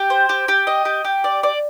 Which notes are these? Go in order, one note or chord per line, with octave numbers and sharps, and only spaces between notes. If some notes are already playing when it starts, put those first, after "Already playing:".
Already playing: G4
C5
G4
G4
D#5
G4
G4
D5
D5